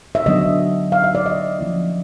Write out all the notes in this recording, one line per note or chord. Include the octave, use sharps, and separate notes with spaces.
E5
D3 F#3 B3 D4 D#5
F5
E5
D5
D#5
F3 A#3 C#4 E4